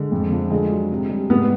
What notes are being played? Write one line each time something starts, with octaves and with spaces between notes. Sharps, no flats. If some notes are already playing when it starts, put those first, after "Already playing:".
Already playing: D3 G#3
F2
F3
D3 G#3
F#3
C3
G3
G#2 B3